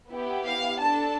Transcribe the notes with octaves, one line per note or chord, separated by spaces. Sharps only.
B3 E4 G4
F5
D4 A4 A5